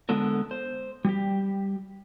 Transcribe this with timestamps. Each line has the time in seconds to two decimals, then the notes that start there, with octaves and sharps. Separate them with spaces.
0.09 D3 G#3 B3 A4 A#4
0.51 C5
1.05 G3 G4